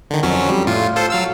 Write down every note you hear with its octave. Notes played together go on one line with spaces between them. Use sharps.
D3 D#3
F2 F#3 C#4
G3
A2 F4
F4 A4 C5
F#3 F5 E6